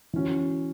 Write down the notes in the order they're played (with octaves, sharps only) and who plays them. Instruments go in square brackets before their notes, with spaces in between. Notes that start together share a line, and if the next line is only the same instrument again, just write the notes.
[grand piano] E3 C#4 F#4